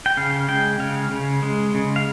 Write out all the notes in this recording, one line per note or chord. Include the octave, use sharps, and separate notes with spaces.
G5
C#3 F5
G#3 G5
C#3 F5
C#3
G#3
C#3
F5